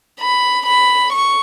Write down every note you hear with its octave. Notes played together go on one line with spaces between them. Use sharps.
B5
B5
C#6